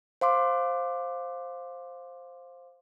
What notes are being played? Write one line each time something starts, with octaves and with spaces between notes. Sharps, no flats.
C5 F5 C6 D6